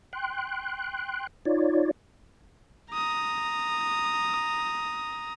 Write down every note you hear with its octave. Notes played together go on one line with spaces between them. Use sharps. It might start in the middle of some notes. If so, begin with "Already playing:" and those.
G5 C6 F#6
D#4 F4 C#5 D5
A#5 D#6